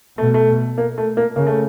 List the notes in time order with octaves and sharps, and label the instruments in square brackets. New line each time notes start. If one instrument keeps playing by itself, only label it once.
[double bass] B2 [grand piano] A3
[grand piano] A3
A#3
A3
A#3
[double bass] C#3 [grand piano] A#3
[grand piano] A3